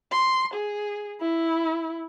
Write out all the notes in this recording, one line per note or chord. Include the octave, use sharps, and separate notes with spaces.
C6
G#4
E4